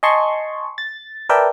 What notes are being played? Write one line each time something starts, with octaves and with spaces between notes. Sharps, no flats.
D#5 G#5 A5 C6 C#6
A6
A#4 B4 D5 E5 G5 A5